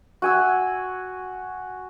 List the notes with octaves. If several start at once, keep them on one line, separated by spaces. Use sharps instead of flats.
F#4 G#5 E6